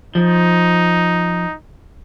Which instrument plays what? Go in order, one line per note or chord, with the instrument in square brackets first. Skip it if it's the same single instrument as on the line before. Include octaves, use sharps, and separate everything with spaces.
[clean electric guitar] F3 [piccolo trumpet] D#4